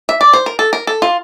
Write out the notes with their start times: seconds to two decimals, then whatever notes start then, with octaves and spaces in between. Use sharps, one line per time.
0.09 E5
0.21 D5
0.33 C5
0.46 A#4
0.59 A4
0.73 A#4
0.87 A4
1.02 F4